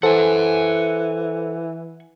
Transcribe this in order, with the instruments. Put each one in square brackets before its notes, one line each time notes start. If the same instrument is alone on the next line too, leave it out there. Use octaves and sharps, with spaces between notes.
[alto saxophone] E3 [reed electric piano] A4 C5 [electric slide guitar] F#5 G#5